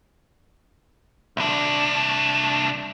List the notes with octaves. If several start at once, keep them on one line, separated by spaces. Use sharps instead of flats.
C2 D4